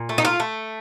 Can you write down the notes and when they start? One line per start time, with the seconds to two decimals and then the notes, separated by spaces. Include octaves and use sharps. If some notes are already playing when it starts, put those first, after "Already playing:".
Already playing: A#2
0.09 A3
0.18 D#4
0.25 F4
0.40 A3